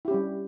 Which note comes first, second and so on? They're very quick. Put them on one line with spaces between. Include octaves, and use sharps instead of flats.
E4 G4 C#4 G3